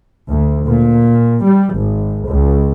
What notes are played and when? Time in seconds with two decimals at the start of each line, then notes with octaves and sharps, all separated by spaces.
0.28 D2
0.65 A#2
1.43 G3
1.74 G#1
2.28 C#2